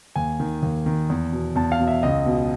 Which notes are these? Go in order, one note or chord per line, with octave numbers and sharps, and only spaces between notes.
D#2 G#5
D#3
D#2
D#3
E2
B2
E2 A5
F5
B2
E5
C#2 D#5
B2